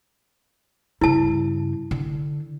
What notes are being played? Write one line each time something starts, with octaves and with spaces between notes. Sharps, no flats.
G2 C#3 E4 A5
D3